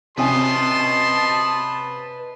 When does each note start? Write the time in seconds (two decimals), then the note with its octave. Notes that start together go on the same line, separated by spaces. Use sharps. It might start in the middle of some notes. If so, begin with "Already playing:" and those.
0.17 C3 C#4 B4 D#5 G#5 A5 C6